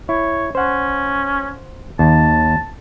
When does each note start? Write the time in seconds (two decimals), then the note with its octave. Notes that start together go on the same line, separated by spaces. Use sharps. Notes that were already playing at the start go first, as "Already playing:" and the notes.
0.09 E4 C#5
0.55 C#4 C5 F#5
1.99 D#2 A5